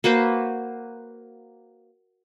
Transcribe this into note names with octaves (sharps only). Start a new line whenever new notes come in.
A#3 F#4 B4 C5